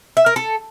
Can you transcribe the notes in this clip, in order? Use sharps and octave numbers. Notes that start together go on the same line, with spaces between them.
E5
A#4
A4